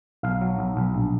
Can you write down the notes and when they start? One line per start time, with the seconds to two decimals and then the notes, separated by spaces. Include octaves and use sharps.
0.23 B1 F5
0.41 F#3
0.59 B1
0.77 B1
0.94 A#1